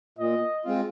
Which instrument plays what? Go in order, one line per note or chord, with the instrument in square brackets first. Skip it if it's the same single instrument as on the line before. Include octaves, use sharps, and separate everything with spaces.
[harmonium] A#2 [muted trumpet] D#5
[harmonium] G#3 C4 F4